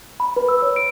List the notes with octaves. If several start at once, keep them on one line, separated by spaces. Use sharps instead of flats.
B5
B4
E6
C#5
D7